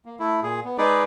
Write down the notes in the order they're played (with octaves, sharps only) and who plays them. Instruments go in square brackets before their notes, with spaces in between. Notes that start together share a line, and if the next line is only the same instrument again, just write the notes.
[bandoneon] A#3
A3 E4
A#2 G#4
B3
G#3 D#4 G#4 B4 D5